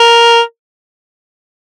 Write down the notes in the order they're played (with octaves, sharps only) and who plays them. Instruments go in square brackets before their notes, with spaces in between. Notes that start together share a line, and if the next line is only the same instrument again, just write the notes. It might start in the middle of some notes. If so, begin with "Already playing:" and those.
Already playing: [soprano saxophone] A#4